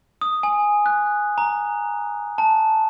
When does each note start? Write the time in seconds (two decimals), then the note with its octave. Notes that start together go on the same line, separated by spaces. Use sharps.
0.21 D#6
0.43 G#5
0.86 F#6
1.38 A#5
2.38 A5